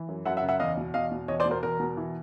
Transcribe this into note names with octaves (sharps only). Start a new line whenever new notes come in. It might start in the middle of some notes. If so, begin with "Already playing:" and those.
Already playing: E3
F#2
F#2 E5 F#5
E5 F#5
C#3
E5 F#5
E2 D#5 F5
B2
E2 D#5 F5
B2
E2 C#5 D#5
C5 D5
B2
A#4 C5
E2 A#4
B2
E3